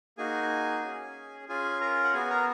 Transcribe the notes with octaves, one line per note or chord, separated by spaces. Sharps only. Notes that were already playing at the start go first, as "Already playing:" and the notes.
A#3 D#4 F#4 G#4 G#5
C#4 G#4
C#4 F4 G#4 G#5
A#4 A#5
F#5
B3 F#4 G#4 G#5
A#4 A#5